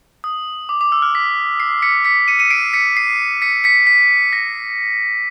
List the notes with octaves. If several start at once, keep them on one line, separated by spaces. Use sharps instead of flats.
D#6
D6
D6
E6
F6
B6
C7
B6 C#7
B6 C#7
C#7 D#7
C#7 D#7
C7 D7
B6 C#7
C7
B6 C#7
B6 C#7
B6
A#6